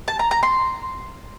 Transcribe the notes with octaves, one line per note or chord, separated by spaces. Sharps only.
A5
A#5
A#5
C6